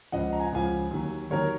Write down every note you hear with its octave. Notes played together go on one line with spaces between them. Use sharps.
C#2 C#3 F3 D#5 F#5
A#5
G#5
F#5
C#2 C#3 F3 F5 G#5
D#2 D#3 F#3
D#2 D#3 F#3 A#4 C#5